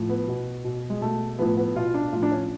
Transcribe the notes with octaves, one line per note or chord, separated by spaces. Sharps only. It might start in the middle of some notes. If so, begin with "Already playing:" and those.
Already playing: A2 F3
B3
B2
B2
G#3
B2 A3
A2 F3 B3
B3
B2 F4
D4
A2 F3 F4
D4
C#4